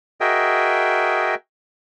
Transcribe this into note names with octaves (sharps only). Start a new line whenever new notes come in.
F#4 G#4 A#4 D#5 E5 G5